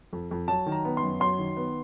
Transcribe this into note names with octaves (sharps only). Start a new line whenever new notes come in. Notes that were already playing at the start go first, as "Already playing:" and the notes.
F2
F2
F#3 A5
D#3
A#5
B3
C6
F#2
F#3 C6
D#3
B3